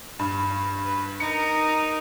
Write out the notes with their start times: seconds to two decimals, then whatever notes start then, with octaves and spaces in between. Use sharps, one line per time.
0.19 G2
0.85 B4
1.20 D#4 A#4 C#7